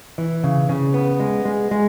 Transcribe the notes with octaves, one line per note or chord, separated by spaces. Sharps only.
E3
C#3
C#3
B3
G#3
G#3
G#3